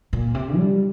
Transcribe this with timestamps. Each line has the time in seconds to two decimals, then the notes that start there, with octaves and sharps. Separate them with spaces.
0.13 A#2
0.34 C3
0.57 G3